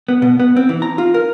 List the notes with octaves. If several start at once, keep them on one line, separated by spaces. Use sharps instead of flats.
B3
B2
B3
C4
E3
A#5
F4
A#4